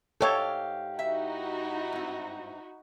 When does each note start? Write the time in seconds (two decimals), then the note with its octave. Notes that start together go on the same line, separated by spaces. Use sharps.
0.21 G#2 G4 A4 C#5 F5
0.99 D#4 E4 F#4 E5
1.92 G2 C4